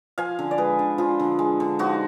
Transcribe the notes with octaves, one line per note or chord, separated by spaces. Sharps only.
F3 F5 G#5
D3
D5
G#3 G#4 B4
D3
F3 F4 G#4
D3
G#3
D3
F3 D#4 F#4